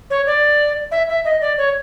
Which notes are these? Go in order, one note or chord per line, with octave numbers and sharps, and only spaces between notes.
C#5
D5
E5
E5
D#5
D5
C#5